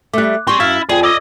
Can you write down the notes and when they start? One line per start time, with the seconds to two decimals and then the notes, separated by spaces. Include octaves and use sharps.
0.13 G3 A3 D6 F#6
0.47 G3 C4 G#4 G5 C#6
0.60 F#2 E4 F5 F6 A6
0.89 F2 G#4 D5 G5
1.03 D5 D#5 D6 E6 G#6